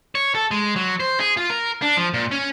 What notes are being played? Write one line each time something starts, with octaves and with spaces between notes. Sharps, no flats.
C#5
A4
G#3
F#3
C5
G#4
F4
A#4
D4
F3
A#2
C#4